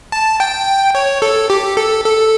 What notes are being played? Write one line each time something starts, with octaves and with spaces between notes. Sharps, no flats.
A5
G5
C#5
A4
G4
A4
A4